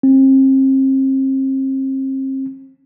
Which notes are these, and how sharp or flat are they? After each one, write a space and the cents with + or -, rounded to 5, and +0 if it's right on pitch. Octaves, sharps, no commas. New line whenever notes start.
C4 +35